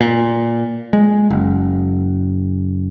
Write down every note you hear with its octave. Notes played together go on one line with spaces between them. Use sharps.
A#2
G#3
F#1